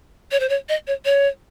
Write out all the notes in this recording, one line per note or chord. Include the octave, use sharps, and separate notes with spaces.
C#5
C5
C#5
D#5
C#5
C#5